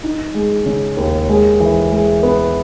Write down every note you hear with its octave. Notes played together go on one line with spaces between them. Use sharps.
D#4
G#3
C#3
D#2
G#3
E3
G#3
B3